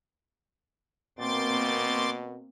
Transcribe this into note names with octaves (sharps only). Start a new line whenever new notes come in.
B2 A#3 C4 C6 D6 A6